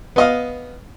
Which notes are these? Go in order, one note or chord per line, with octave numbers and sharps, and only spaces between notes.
B3 D#5 F5